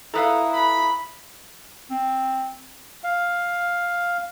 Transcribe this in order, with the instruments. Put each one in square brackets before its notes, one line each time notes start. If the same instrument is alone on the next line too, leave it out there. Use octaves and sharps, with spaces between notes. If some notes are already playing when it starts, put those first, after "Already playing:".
[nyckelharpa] E4 [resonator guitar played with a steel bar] A4 B4 F5 [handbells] A#5 D#6
[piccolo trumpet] B5
[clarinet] C4
[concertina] F5